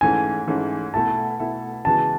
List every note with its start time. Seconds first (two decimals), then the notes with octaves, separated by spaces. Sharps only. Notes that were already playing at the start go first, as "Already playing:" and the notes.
0.01 G#2 E3 A3 C#4 G#5
0.47 G#2 E3 A3 C#4
0.94 B2 A3 E4 A4 A5
1.39 B2 A3 E4 A4
1.85 C#3 E3 G#3 B3 F#4 A5